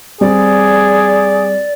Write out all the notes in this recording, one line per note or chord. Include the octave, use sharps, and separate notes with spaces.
G3 C4 G#4 D5